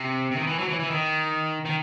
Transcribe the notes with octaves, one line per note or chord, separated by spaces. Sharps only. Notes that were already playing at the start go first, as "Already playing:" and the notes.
Already playing: C3
C3
D#3
E3
F#3
E3
E3
D#3
D#3